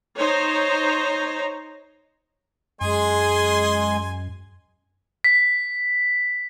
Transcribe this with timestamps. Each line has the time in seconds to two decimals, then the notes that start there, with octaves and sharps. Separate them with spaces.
0.18 D#4 C5 C#5 A#5
2.81 F#2 G#3 G#4 G#5 C6
5.24 B6